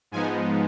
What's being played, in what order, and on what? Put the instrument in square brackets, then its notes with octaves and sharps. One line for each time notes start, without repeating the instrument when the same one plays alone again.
[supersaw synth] G#2 F3 G#3 B3 D#4 G#5